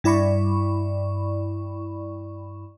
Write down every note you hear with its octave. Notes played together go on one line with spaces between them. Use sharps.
G2 E4 D5 B5 C#6